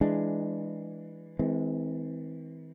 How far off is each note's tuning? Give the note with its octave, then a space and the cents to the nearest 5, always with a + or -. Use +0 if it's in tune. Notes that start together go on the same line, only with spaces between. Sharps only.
E3 +0 G#3 +0 D4 +5
E3 -45 G#3 +15 C4 -25